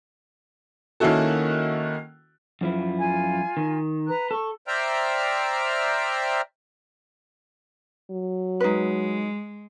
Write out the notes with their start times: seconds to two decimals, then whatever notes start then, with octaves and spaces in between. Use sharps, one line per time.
1.00 D#3 A#3 C#4 E4 F#4 A4
2.61 F#2 F3 E4
2.99 F4 G#5
3.57 D#3
4.08 B4 A#5 F#6
4.31 A4 C#6
4.68 C5 D5 E5 G5 A#5 F6
8.11 F#3
8.60 G#3 D#4 B4